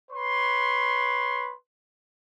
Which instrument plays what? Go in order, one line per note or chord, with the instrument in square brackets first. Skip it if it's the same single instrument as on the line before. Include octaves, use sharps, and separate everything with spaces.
[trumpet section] B4 C#5 C6